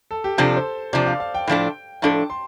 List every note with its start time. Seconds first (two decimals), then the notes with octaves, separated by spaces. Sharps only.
0.11 A4
0.24 G4
0.38 C3 F3 D4 A4
0.56 C5
0.93 C3 F3 D4 D5
1.06 F5
1.20 F5
1.34 G5
1.47 A2 F3 D4 A4
2.02 A2 F3 D4 A4 A5
2.30 C6